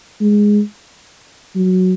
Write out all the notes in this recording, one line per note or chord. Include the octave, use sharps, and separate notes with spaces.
G#3
F#3